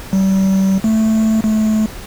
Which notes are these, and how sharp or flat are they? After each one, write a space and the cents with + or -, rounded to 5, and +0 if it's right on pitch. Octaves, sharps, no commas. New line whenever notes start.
G3 -35
A3 +0
A3 -25